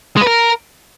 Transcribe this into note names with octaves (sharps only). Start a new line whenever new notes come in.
G#3
B4
A#4